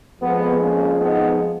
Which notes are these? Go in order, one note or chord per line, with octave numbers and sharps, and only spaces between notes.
F2 F3 G#3 B3
A#3 C#4
B3 D#4